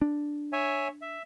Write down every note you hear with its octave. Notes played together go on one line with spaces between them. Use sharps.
D4
C#5 E5 G#5
E5